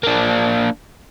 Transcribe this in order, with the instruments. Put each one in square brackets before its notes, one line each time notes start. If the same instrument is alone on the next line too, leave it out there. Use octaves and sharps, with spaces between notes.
[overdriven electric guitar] A#3 D4